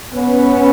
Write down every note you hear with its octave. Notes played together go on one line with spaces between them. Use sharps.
B3 C#4